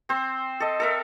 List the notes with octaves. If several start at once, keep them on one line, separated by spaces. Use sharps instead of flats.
C4 C5
A4 D#5
A4 A#4 E5